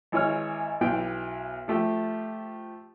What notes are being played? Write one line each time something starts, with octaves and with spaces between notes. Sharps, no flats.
G#1 E3 C#5 F6
B1 E3 G5
F3 A3 G4